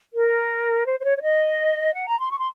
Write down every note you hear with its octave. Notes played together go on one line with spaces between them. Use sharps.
A#4
C5
C5
C#5
C#5
D#5
F#5
A#5
C6
C#6
C6